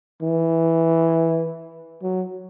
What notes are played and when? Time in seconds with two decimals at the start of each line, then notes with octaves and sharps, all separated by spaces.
0.22 E3
2.03 F#3